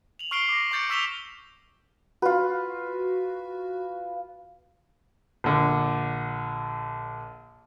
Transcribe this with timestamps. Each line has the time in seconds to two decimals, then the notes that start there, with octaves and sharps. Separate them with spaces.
0.19 F7 F#7
0.31 C#6 F6 C7 D7 F7 G7
0.49 D6 A#6
0.71 C#6 D6 G6 A6 C#7 D7
0.89 C#6 E6 B6 E7 F7 G7
2.22 F4 F#4 B4
5.44 A#1 D3